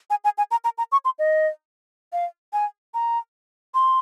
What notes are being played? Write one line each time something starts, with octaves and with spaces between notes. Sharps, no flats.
G#5
G#5
G#5
A#5
A#5
A#5
C#6
C6
D#5
F5
G#5
A#5
C6